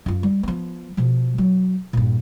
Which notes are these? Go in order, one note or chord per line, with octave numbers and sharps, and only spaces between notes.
F#2 F4
G3
F3 B3
B2 F3
F#3
G2 A#2